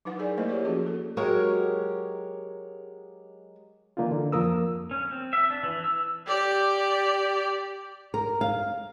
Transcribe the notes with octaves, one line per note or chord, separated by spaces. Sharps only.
F#3 D#4 E4 B4 F#5
G#4 A#4 D5 G#5
A3 A#3 E4 A#4 C5 D#5
F4 G4 A#4 C#5 D5
F3 C#4 F4 F#4 G#4
A#3 A4
F#3 G#3 G4 A#4 C#5
D3 E3 A#3 D4 D#4 F4
D3
F2 F3 A#3 A#4 D#6 E6
C#4
C4
E5
D4
E3
E6
G4 D5
A#4
F5